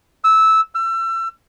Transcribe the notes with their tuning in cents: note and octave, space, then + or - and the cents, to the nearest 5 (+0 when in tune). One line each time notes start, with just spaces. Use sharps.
E6 -15
E6 +30